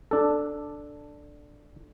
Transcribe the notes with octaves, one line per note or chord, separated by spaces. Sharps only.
D4 A4